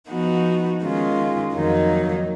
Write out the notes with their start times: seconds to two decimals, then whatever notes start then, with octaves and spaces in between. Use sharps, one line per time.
0.08 F3 B3 D#4 F#4
0.81 D#3 G#3 C#4 F4
1.54 F2 D#3 F#3 A#3 D#4